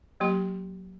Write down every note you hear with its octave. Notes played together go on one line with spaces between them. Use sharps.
F#3 A#3 G4 C6